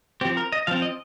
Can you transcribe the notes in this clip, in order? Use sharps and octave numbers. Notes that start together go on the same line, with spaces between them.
F3 C4 G4
A#4
D#5
F3 C4 F5
D#5